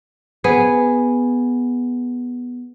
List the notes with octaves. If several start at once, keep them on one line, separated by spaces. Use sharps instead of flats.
B3 G#4